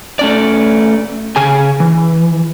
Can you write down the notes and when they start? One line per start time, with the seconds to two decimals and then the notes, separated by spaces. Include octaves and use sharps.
0.19 A3 C#4 D5
1.36 C#3 G#4 G#5
1.80 E3